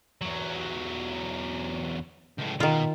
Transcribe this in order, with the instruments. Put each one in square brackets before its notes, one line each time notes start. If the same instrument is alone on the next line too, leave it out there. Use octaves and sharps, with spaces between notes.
[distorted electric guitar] E2 F#3
C#2 A2
[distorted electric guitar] B2 [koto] D#3 F4